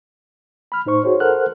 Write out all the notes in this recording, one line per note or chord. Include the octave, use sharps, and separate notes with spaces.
B5 F6
A2 D#4 C5 C#6
F#4 G#4 C5 C#5
A4 A#4 C5 F#5 F6 F#6